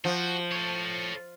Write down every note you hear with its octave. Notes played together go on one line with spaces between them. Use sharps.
F3 F#4
A4 C#5